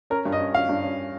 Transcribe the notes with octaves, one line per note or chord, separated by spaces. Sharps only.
C#4 A#4
G2
D#5
C#4
C#4 F5
G2
C#4